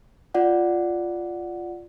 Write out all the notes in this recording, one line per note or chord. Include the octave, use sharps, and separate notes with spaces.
F4 D5 F#5